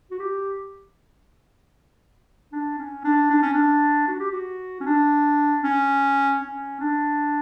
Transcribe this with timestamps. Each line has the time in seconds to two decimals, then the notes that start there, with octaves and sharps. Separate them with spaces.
0.11 F#4
0.19 G4
2.52 D4
2.78 C#4
3.05 D4
3.30 D4
3.42 C#4
3.54 D4
4.08 F#4
4.20 G4
4.32 F#4
4.81 C#4
4.86 D4
5.64 C#4
6.41 C#4
6.81 D4